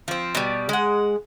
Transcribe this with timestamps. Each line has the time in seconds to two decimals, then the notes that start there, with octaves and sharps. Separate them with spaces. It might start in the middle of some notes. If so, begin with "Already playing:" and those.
0.08 F3 C4
0.35 B2 G3
0.69 G#3 F#5